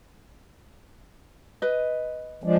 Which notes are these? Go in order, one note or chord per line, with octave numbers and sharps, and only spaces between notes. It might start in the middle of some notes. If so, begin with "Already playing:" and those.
B4 D#5
F3 G#3 D4